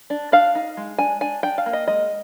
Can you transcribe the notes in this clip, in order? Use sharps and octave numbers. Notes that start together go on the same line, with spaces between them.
D4
D4 F5
D#4
G#3
D4 G#5
D4 G#5
D4 G5
F5
A#3
D#5
G#3 D#5